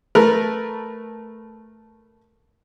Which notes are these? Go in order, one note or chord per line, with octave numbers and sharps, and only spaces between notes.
A3 A#4 B4